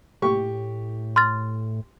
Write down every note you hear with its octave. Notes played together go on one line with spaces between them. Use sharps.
A2 G4 C#6
C6 F6 A6